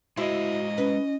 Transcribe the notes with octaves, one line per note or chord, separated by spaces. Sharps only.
G#3 E4 F#4 C5 D#5 F5
C#4 B4